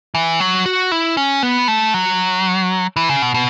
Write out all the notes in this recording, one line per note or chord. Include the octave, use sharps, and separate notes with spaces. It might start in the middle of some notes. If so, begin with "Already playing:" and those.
E3
F#3
F#4
E4
C#4
B3
A3
F#3
E3
C#3
B2
B2